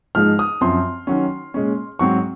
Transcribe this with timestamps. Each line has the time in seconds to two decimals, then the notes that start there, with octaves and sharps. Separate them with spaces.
0.15 G#2 F3 G#3 D#4 F6
0.39 D#6
0.61 F#2 F3 C4 C6
1.07 D#3 F#3 C#4
1.54 A#2 G#3 C#4
1.99 G#2 F#3 C4 C#6